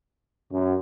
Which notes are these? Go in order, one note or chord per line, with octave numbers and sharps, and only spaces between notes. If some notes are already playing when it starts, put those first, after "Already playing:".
F#2